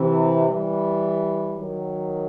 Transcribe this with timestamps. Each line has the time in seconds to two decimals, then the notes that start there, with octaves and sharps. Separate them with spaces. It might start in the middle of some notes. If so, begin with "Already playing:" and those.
Already playing: C3 E3
0.49 E3 G3
1.58 D#3 F#3